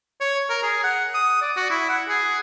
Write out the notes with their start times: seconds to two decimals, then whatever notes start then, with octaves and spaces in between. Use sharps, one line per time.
0.20 C#5
0.50 A#4
0.63 G#4
0.84 F#5
1.14 D#6
1.42 D5
1.56 F#4
1.70 E4
1.89 F#5
2.09 G#4